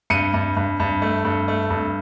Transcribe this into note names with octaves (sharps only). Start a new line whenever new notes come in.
G2 C#7 D#7
G2
G2
G2
A3
G2
A3
G2